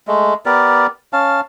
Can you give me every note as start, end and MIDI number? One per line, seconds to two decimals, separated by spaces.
0.08 0.34 56
0.08 0.34 57
0.46 0.87 59
0.46 0.87 67
0.46 0.87 70
0.46 0.87 74
1.13 1.41 61
1.13 1.41 77
1.13 1.41 81